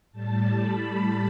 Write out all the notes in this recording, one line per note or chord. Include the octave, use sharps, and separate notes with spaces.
A2 G3 A5
B5